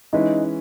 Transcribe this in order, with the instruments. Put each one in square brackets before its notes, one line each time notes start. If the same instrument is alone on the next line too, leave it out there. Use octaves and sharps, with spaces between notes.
[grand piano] E3 G#3 C#4 E4 B4 [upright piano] D#4